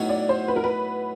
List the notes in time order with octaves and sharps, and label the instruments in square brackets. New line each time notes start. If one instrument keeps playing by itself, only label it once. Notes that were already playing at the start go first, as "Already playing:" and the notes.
Already playing: [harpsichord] A2 F#3 B3 D#4 F#4
[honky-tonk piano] D5
C5
B4
A#4
B4